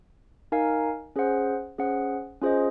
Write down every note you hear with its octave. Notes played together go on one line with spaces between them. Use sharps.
D#4 A#4 F5 G#5
C#4 G#4 C5 F#5
C#4 G#4 C5 F#5
C#4 F4 G#4 C5 D#5